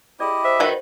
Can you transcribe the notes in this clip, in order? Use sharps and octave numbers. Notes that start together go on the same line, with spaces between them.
E4 G4 G#4 D5 D#5
C5 E5
D#3 F#4 B4